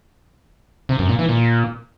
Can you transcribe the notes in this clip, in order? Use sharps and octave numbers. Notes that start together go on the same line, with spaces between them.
C3
F#2
A#2
E3
A#2